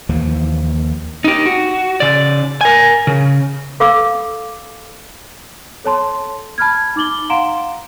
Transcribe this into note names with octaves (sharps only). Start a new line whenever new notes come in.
D#2 E3 F3 A#3
D#4 G4
F#4
C#3 D5
A#4 G#5
C#3
A4 F5 D6 E6
A4 C#5 A5 C6
A5 B5 F6 G#6
D#4 D6 A6 F#7 G7
F5 F#5 A#5 C6 D7 E7